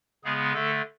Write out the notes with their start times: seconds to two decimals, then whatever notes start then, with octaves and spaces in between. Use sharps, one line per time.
0.24 C#3 G#3 B3 G#4
0.53 D3 A3 A4